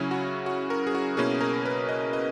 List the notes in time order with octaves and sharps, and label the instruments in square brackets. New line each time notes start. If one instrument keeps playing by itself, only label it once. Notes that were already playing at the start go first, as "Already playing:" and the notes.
Already playing: [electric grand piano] C#3 F#3 C#4 E4
F#4
F#4
A#4
G#4
F#4
B2 A#3 C#4 E4 G#4
G#4
A#4
B4
D#5
D#5